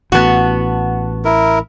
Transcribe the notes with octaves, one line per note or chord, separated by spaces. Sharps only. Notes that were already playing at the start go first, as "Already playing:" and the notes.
A1 B3 F#4 F#5 A5
E4 A#4